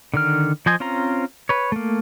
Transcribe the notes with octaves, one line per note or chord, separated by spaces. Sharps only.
D3 D#3 F6
F3 C5 D#5 G#5
C4 C#4 F4 C5 A#5
B4 C#5
A3 A#3